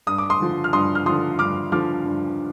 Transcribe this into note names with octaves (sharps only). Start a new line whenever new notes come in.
G2 D#6
D6
C6 D#6
D3 F3
F6
G2 C6 D#6
F6
D3 F3 C6 D#6
G2 D6 F6
D3 F3 D6 F6
G2